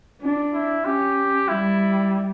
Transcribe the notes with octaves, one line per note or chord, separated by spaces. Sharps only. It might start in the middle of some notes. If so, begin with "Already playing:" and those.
D4
E4
C#4 G4
G3 E4